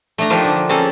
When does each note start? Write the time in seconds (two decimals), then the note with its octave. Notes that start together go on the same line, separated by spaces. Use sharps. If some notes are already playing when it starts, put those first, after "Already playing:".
0.18 A3 D4 A#5
0.30 F3 A#3 D4 D#4 F4 G4
0.44 D3
0.69 A#3 C4 C#4 G#4 A4